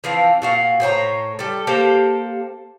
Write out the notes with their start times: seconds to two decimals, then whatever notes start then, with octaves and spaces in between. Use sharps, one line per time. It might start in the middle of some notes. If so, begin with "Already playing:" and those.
0.04 E3 F3 C4 F5
0.42 A#2 F#4 F5
0.80 A2 C5 C#5 A#5
1.39 G3 A4
1.67 A#3 G4 A4 C5